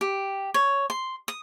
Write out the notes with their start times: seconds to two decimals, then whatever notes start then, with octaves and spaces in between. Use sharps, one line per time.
0.01 G4
0.54 C#5
0.90 C6
1.28 D#6